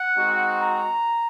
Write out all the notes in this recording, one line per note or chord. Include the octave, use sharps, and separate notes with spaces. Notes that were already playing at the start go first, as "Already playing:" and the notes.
Already playing: F#5
G#3 C4 D#4 F#4
A#5